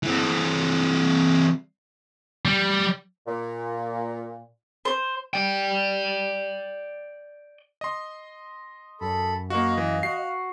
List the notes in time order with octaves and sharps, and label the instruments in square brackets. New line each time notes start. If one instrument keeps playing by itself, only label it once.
[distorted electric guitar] E3 C4
G3
[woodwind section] A#2
[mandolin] C5
[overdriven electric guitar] D5 G5
[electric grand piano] D#5 C6
[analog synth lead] F#2 [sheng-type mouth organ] A4 B5
[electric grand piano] A#3 F#4 [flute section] D#5 [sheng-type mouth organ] F5
[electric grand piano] E3
[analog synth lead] F#4 [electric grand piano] C7